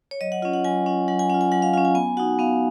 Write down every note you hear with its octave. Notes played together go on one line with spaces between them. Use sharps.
C#5
F#3 D#5
F#5
C#4 F4 F#5
F#5
F#3 G#5
C#4 F4 F#5
F#3 F#5
G#5
C#4 F4 F#5
G#5
F#3 F#5
F5
C#4 F4 F5
G#5
B3 G#5
D#4 F#4 F#5
B3 F5